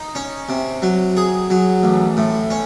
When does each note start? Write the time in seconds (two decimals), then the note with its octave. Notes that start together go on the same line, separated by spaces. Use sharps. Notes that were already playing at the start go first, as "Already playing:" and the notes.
Already playing: D#4
0.15 C#4
0.49 C3
0.82 F#3
1.17 G#4
1.50 F#3
1.83 A1
2.17 A2
2.50 C#4